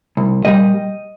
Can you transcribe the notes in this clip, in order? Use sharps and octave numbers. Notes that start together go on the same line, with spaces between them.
C2
A#2 G3 D#5